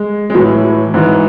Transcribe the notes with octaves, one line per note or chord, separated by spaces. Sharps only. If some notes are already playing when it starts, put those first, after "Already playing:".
Already playing: G#3
G#3
A2 E3 F#3
G#2 E3